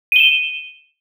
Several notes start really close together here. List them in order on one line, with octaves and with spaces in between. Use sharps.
D#7 G7 E7